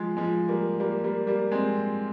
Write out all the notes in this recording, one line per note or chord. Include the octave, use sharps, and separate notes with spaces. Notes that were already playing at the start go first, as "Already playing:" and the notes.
Already playing: F3 G#3
F3 G#3
G3 A#3
G3 A#3
G3 A#3
G3 A#3
G#3 C4